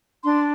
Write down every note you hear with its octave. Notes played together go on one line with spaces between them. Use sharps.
D4 C6